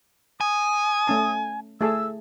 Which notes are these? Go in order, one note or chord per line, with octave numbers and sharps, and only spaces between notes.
G#5 D#6
A3 C#4 A5
A3 G#4 A5 E6